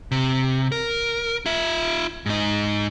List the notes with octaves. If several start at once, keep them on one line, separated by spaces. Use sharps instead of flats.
C3
A#4
F4 E5
G#2 D#4